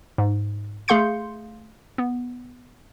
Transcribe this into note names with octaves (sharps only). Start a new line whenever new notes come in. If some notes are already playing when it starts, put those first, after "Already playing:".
G#2
A3 G#4 F5 C6 G6 C#7
B3